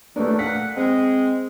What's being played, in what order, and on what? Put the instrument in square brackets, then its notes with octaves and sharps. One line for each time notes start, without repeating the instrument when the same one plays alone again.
[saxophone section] F#2 D#3 E3 [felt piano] A3 D4
[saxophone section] A#2 F#5 [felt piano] B6
[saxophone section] G#3 [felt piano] C4